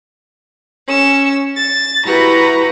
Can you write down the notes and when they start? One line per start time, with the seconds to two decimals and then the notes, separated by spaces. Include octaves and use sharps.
0.87 C#4 E6
1.56 A6
2.05 E4 F#4 G4 B4 A#5